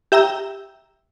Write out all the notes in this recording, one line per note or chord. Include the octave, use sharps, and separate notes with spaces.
G4 E5 G5 A#5 E6